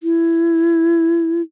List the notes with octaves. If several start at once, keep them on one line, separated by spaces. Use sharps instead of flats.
E4